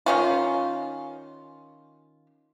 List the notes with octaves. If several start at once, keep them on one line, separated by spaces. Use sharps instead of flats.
D#3 C#4 F4